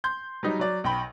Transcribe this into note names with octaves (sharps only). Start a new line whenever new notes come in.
C6 G6
F#3 G3 D#4
F#3 D5
B1 G5 B5